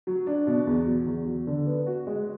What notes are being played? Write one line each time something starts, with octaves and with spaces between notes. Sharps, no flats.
F#3
D4
B2
E2
F#3
E2
F#3
D3
B3
F#4
G#3